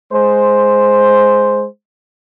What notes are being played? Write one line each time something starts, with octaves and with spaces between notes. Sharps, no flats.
G#3 C5